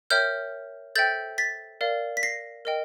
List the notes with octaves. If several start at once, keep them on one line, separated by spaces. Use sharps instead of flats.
A#4 C#5 E5 G5 F6 G6
A4 C5 E5 G5 G6 A6
A6 B6
A#4 D5 F5
B6
A#6 C7
A#4 D#5 G5